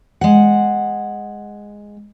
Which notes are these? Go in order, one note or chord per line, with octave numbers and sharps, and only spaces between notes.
G#3 F#5